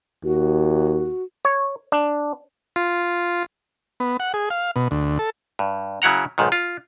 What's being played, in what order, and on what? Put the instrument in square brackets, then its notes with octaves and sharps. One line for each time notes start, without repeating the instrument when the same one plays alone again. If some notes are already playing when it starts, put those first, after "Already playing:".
[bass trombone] D#2 [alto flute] F#4
[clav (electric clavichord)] C#5
D4
[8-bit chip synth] F4
[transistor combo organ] B3
F#5
G#4
F5
B2
D2
A4
[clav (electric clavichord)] G2
C#3 F#3 E4 F#5 A#5
B1 G#2 D#3
F4